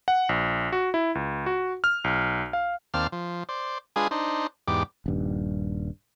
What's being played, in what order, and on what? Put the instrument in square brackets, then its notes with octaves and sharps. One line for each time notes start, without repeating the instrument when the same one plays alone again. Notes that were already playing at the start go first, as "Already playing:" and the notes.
[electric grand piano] F#5
A#1
F#4
E4
C#2
F#4
F6
B1
F5
[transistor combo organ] D#2 C4 D5 F5 A5 F6
F3
C5 D5
G#3 D4 F4 G#4 B4 G#5
D4 D#4 C5
E2 G#2 G4 D5 D6
[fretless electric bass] D#1 G2